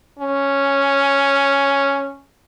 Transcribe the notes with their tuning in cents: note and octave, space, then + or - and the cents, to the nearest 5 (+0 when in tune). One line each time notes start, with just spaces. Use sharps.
C#4 +0